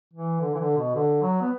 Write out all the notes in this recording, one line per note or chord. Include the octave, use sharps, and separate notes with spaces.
E3
D3
E3
D3
B2
D3
F#3
B3